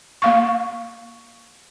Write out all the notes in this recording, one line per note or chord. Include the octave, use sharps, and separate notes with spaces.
A#3 F5 C#6